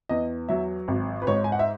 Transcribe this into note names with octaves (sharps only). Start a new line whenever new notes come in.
E2 D#5
F#3 E5
G#1
B4
G#2 C#5
G#5
F#5
E5